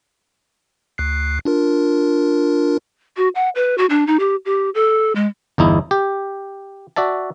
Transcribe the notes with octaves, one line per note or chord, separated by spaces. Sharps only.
D2 F#6 C7
D4 F4 A#4
F#4
F#5
B4
F#4
D4
D#4
G4
G4
A4
G#3
G1 E2 D#4 E4
G4
F#4 D5 E5 A5